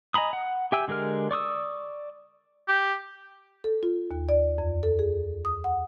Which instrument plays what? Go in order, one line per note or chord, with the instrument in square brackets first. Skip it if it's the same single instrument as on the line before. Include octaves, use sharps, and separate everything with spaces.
[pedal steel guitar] D#5 G#5 A#5 B5 D#6
F#5
G4 E5 G5 G#5 E6
D3 G#3 G4 A#4 F6
D5 C#6 D#6 E6
[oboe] G4
[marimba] A4
F4
D#2
D5
F2
A4
G#4
D#6
F#5